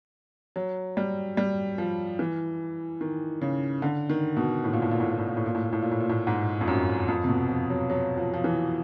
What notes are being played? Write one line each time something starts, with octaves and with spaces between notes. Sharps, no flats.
F#3
G3
G3
F3
E3
D#3
C#3
D3
D#3
B2
A2
A#2
A2
A#2
A2
A#2
A2
A#2
A2
A#2
A2
A#2
A2
A#2
A2
A#2
A2
G#2
F2
F#2
F2
C3
B2
F3
F#3
F#3
F3
F3
E3